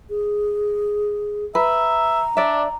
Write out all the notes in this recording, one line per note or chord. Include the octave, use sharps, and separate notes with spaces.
G#4
B4 E5 A#5
D4 D5 E5